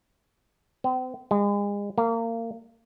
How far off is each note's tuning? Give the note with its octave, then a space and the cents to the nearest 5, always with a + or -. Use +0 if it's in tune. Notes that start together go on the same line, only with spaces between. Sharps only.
C4 -40
G#3 -35
A#3 -25